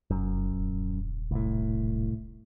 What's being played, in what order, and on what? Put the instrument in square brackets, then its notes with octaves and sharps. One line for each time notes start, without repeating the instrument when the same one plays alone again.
[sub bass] F1 [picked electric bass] F#2
[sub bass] D#1
[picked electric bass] C2 A2